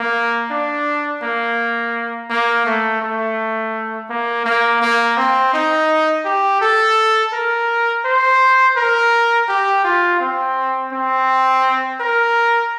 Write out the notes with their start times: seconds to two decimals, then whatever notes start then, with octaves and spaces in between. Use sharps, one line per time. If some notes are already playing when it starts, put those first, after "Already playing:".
Already playing: A#3
0.51 D4
1.23 A#3
2.30 A#3
2.66 A3
3.02 A3
4.10 A#3
4.46 A#3
4.82 A#3
5.17 C4
5.53 D#4
6.25 G4
6.61 A4
7.33 A#4
8.05 C5
8.76 A#4
9.49 G4
9.84 F4
10.20 C4
10.92 C4
12.00 A#4